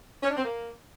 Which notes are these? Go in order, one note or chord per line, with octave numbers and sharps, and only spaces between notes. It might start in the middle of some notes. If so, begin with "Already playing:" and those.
C#4
D4
C4
A#3